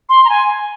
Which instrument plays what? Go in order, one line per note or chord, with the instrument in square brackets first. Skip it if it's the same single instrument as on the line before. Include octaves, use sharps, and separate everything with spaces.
[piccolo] C6
A#5
G#5